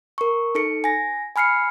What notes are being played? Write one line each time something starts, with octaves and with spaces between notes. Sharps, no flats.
A#4 C#6
D#4 A4 C#7
G#5 A#6
G#5 B5 F6 C7 C#7